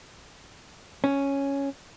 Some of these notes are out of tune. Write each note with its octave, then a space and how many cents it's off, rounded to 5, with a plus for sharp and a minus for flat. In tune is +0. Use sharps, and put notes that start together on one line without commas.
C#4 +0